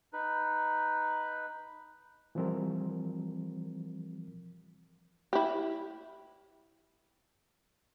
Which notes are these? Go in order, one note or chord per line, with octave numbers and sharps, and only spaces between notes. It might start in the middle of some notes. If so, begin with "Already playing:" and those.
D#4 B4
E3 F3 G3 C4 A#4
E4 G4